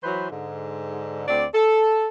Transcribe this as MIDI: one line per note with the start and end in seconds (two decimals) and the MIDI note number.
0.03 0.27 52
0.03 0.27 54
0.03 0.27 71
0.03 0.27 72
0.30 1.26 44
0.30 1.26 50
1.27 1.45 38
1.27 1.45 60
1.27 1.45 74
1.53 2.07 69